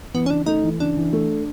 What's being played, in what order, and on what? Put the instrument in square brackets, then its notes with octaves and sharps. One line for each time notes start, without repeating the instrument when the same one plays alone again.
[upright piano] E3 [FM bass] B3
[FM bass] C#4
[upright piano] C#3 [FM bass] D4
[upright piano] A3 [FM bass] D#4
[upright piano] E3
[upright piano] C#3 [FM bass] D4
[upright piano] E3
A3